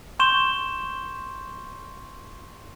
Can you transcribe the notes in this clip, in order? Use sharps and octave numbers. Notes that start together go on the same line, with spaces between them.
C6 C#6 G6 E7 G7